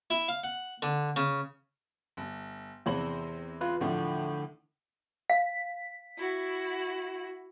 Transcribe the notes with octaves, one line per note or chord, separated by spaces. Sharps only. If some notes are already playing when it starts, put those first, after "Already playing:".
E4
F5
F#5
D3
C#3
G1
E2 C3 C5 F#7
F4 B4
A2 D3 F3
F5 B6
E4 F#4